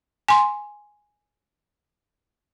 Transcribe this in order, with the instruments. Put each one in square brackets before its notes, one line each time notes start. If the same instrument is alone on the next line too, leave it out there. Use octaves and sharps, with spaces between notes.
[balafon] G#5 C6